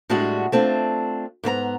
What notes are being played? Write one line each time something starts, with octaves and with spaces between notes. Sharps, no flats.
A2 G3 G#3 D4 F#4
A3 C4 D4 F4
G#2 B3 C5 A#5